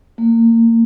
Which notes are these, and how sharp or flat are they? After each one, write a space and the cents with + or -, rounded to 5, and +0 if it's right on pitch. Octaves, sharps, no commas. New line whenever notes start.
A#3 -30